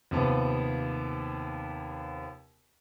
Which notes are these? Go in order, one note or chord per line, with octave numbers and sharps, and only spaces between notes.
D#2 C3 F3 B3 C4